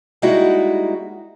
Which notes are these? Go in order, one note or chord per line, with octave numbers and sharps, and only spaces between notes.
G3 G#3 A#3 D#4 E4 F#4